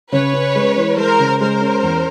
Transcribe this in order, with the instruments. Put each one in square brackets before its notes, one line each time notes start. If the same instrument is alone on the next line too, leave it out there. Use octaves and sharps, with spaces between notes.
[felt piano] C#3 [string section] B4 C#5
[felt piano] C#4
G#3
E3
[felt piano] G#3 [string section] A#4 C5
[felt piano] C#3
[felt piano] G#3 [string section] A#4 C5
[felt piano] C#4
E2